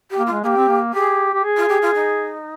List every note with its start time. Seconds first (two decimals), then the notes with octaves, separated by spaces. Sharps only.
0.10 G4
0.18 A#3
0.27 G#3 F4
0.43 A#3 G4 G#4
0.57 C4
0.68 A#3
0.93 G4 G#4
1.34 G4
1.44 G#4
1.57 F4
1.69 G4
1.82 F4
1.95 D#4